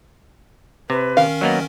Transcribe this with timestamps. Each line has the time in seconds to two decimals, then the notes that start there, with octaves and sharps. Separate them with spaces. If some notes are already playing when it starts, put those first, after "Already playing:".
0.90 C3 B4
1.17 D#3 C#4 A#4 F5
1.41 F#3 A#3 B3 D#5